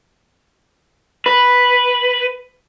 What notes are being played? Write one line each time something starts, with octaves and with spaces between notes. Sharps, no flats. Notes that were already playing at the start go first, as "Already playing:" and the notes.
B4